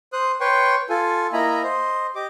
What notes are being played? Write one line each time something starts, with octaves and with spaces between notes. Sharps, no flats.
C5 D#6 F#6
B4 C#5 G5 C6 C#6
F4 A4 G#5
A#3 E4 D#5 G#5 A#5 B5
C5 D#5
G4 D#5 D6